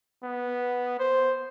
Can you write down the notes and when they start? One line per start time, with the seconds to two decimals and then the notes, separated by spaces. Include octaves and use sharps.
0.24 B3
1.00 C5